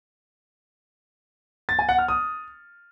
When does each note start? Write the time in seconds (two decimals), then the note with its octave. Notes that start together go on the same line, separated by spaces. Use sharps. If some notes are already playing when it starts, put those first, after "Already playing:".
1.69 A6
1.79 G#5
1.89 F#5
1.99 F6
2.08 D#6